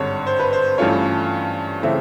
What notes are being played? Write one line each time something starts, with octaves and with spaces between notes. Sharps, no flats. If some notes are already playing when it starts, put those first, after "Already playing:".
Already playing: G#1 G2 D3 C#5
C5
B4
C5
G2 E3 A3 C#4 F4 C#5
C#3 E3 A3 C4 E5